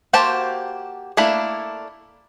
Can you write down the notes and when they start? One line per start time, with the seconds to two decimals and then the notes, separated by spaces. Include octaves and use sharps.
0.13 A#3 F#4 G4 C5 A5
1.17 A3 A#3 D4 E4 B5